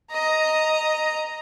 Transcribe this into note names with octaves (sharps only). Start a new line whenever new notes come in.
D#5 A#5